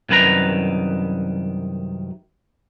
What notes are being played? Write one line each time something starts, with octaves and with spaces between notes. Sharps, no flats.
C2 F#2 D#3 B4 A#5